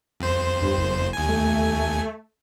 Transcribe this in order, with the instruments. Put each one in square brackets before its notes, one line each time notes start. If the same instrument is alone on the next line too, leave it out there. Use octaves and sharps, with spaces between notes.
[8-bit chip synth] F2 C5
[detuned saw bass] G2
F#1
[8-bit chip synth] D#2 G#5
[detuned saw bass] A3